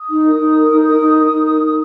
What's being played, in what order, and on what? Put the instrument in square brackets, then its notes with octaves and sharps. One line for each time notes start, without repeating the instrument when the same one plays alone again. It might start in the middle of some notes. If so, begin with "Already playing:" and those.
Already playing: [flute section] D#6
D#4
A#4
D#4
A#4
D#4
A#4
D#4
A#4
D#4
A#4
D#4